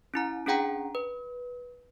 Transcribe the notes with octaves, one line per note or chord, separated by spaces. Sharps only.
C#4 E4 A#5
C#4 D4 G#4 F#5 G5 A#5
B4